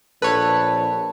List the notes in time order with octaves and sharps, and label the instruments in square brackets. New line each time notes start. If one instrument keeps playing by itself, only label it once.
[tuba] A#1 [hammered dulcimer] A4 [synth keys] B4 C#5